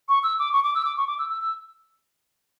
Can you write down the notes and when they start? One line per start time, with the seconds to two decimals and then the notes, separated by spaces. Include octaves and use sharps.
0.09 C#6
0.23 E6
0.39 D6
0.53 C#6
0.64 D6
0.75 E6
0.85 D6
0.97 C#6
1.07 D6
1.19 E6
1.29 E6
1.41 E6